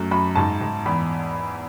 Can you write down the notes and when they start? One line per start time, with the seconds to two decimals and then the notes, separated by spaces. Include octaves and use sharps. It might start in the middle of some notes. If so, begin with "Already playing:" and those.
Already playing: F#2 A3
0.11 F#2 B5
0.35 G#2 A5
0.61 G#2
0.86 E2 B5